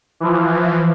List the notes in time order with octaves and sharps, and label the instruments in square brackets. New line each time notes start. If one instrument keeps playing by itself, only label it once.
[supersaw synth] E3 F3